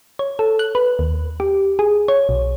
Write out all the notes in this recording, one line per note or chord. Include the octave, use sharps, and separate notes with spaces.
C#5
A4
F#6
B4
D#2
G4
G#4
C#5
B1